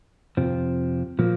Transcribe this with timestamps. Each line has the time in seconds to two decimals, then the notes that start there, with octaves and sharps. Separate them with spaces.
0.37 F2 C3 F3 C4
1.19 A#2 F3 A#3